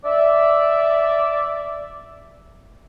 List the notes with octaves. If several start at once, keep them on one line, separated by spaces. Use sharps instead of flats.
D5 E5